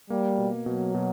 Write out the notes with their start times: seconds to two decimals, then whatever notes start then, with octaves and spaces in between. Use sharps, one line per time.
0.10 G3 A#3
0.38 B2
0.66 B2 F#3
0.94 B2